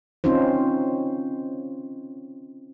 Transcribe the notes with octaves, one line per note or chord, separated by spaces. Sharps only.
C4 C#4 D#4 F4 C5